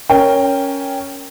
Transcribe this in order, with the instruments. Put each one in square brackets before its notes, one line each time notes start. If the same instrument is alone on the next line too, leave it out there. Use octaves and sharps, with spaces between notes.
[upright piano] C#4 A#4 G5